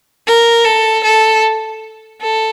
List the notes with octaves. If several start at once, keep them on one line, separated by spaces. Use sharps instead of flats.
A#4
A4
A4
A4